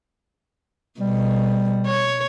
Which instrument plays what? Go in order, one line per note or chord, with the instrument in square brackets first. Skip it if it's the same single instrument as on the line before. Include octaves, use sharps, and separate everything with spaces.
[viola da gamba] B2 [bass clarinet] G3
[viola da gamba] C#5